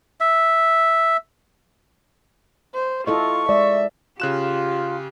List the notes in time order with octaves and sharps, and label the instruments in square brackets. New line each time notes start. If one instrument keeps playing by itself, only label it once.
[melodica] E5
[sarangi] C5
[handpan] E4 A4 D#5 [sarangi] F4 [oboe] C#6
[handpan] G#3 [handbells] D5 [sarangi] E5
[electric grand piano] C#3 F#6 E7 [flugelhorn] F4 [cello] G4